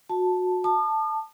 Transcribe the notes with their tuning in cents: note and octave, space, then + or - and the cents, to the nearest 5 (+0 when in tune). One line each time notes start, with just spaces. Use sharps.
F#4 -25 A5 +0
A5 +0 D#6 -45